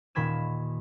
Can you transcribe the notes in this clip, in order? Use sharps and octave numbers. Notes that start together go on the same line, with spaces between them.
D#1 A#2 D#3 B5 G#6 E7